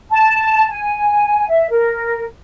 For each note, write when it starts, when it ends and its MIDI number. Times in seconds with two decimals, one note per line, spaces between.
0.11 0.68 81
0.70 1.49 80
1.49 1.66 76
1.71 2.23 70